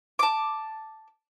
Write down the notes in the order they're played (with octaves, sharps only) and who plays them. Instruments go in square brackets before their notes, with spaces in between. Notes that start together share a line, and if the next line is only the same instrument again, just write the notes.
[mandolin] A5 D6